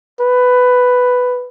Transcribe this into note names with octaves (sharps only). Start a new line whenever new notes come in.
B4